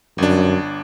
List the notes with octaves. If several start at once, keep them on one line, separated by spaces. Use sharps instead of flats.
G1 F#2 D4